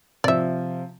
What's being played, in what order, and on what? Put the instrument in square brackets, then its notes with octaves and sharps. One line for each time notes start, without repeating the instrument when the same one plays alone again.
[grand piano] C3 F3 [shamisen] D5 E5